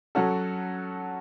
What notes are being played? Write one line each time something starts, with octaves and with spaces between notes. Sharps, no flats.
F#3 C#4 F#4 A4